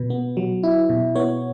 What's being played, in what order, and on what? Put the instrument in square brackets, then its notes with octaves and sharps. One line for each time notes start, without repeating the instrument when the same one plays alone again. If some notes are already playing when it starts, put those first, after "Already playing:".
Already playing: [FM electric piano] B2 B4
B3
F#3
E4
B2
B3 C#5